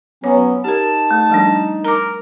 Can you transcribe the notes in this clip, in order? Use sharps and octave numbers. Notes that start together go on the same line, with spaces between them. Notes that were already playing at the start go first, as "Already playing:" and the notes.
F#3 B3 C#4 C#5
D#4 G4 A#4 A5
A3
F3 G3 D4
A#4 A#5 D6